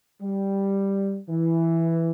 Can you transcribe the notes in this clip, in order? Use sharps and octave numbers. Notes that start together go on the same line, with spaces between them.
G3
E3